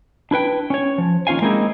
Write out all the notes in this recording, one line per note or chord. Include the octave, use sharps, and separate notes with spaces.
D4 E4 B4 G5
C#4 C#5
F3
D#2 C#4 F4 F5 G#5
G#3 A#3 C4 D#4 E4 G#4